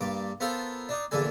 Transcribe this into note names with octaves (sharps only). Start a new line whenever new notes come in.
G2 A#3 D6
B3 F4 A4 A#4 C5
D4 D#4
A#1 E2 A#2 D3 A4 G#5